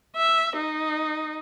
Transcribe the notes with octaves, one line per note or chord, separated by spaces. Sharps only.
E5
D#4